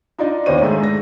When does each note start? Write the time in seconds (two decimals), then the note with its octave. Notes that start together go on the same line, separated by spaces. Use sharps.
0.18 D4 D#4 F4 D5 D#5
0.46 D#2 B3 C5 C#5 D#7
0.61 G#2 D#3 A3 G#4
0.80 G#2 A#6